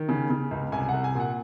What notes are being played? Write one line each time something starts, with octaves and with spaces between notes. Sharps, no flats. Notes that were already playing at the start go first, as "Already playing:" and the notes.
Already playing: D#3
C#3
C#3
C#2
C2 G#5
F#5
C2
G#5
A#2 F#5